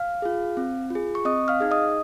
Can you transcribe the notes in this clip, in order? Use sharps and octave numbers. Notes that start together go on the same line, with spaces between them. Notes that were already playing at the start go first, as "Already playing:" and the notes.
Already playing: F5 F6
F4 G#4
C4
F4 G#4
C#6
C4 D#5 D#6
F5 F6
D#4 G#4
D#5 D#6